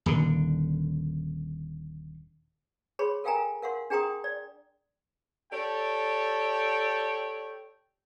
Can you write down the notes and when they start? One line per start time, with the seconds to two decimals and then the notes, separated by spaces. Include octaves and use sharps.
0.06 D#1 D3
2.99 G#4 C#5 B5 C6
3.24 A4 A#4 F5 G5 G#5 A#5
3.62 A#4 F5 F#5 C6
3.90 D4 G#4 G5 A#5 C6 D#6
4.24 D5
5.52 G4 A4 C#5 D5 G5